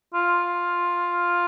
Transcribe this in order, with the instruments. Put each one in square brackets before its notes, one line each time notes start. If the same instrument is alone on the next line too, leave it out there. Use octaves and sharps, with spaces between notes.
[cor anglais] F4